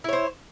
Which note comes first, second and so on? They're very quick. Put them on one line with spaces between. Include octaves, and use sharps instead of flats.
E4 C#5 C5